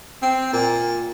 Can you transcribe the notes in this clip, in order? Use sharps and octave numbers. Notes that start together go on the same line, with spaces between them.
C4
A#2